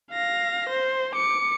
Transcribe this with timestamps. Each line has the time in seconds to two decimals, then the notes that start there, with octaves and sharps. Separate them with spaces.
0.11 F5 A#6
0.69 C5
1.16 D6 C#7